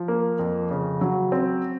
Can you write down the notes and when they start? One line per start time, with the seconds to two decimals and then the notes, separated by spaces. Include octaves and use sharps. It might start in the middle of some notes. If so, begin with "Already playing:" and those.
Already playing: F3
0.08 A#3
0.39 F2
0.70 C#3
1.01 F#3
1.32 C4